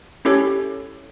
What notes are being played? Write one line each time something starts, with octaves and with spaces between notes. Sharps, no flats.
C#4 E4 G4 A4 C#5